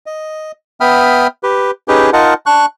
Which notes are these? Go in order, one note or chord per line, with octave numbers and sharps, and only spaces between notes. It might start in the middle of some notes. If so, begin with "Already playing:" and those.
D#5
B3 E5 G5 B5 D#6 F6
G4 B4
C#4 D#4 G4 G#4 B4
D#4 F4 A#4 D#5 F#5 A5
D4 C#6 F#6